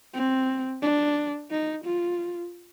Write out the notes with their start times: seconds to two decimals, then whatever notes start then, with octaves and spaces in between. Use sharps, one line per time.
0.14 C4
0.82 D4
1.51 D#4
1.84 F4